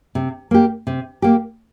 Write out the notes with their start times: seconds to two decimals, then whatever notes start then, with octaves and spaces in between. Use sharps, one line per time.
0.15 C3
0.51 A#3 G4
0.87 C3
1.22 A#3 G4